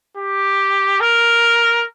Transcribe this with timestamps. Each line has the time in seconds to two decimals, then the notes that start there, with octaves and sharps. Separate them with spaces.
0.17 G4
1.00 A#4